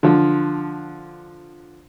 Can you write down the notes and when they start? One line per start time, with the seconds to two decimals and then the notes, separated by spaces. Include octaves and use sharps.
0.03 D3 F3